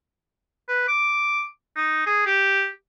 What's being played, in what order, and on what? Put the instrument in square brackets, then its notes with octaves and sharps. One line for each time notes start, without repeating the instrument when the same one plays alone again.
[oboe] B4
D6
D#4
G#4
G4